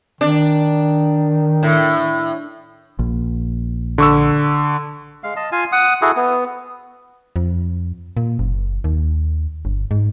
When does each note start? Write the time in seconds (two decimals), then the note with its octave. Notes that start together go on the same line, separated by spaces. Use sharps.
0.21 D#3 D4
1.63 A2
2.99 A#1
3.98 D3 C#6 E6
5.24 G#3 F5
5.36 D#5 A5
5.52 F4 F5 G#5
5.72 F#5 D#6
6.02 E4 F#4 G#4 A4
6.16 B3
7.36 F2
8.17 A#2
8.39 F#1
8.84 D#2
9.65 G1
9.91 G#2